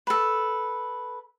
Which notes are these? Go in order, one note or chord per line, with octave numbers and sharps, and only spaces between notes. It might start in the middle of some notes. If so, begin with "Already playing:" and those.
A4 B4